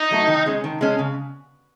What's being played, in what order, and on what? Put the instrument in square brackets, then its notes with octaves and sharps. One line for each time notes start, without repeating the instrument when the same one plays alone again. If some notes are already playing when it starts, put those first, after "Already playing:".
Already playing: [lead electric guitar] D#4
[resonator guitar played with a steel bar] F#3 A3 E4
D#3
G#3 C#4
D#3
G#3 C#4
C#3